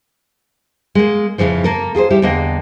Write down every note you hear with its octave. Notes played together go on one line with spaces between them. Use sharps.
G#3 A#3
F2 A#2 C#3 E3 F3
A#3 A4 A#4
F4 G#4 A#4 C5
G3 E4 G4
E2 D3 A#3 D#5 G5